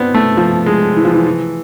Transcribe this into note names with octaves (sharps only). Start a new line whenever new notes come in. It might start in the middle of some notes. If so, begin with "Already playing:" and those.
Already playing: B3 C4 D4
A3
F3
G#3
E3
F3
E3
E3